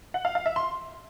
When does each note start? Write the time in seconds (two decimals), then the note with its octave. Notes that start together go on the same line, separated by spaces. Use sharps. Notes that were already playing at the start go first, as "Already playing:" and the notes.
0.14 F#5
0.25 F5
0.35 F5
0.46 E5
0.56 C6